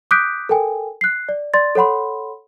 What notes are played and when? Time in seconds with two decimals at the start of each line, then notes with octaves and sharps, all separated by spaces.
0.11 D6 D#6 F#6 G6 B6 D7
0.49 A4 A#4 G5 G#5
1.01 F#6 C7
1.29 D5
1.54 D5 C6 A6
1.75 A4 C#5 F#5 B5 C6